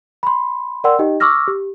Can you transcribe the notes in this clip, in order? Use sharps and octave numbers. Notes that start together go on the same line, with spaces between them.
B5 C6
A#4 D5 F#5 G5 C6 E6
D#4 G4 D#5 G5
C#6 D6 E6 F6 A#6
G4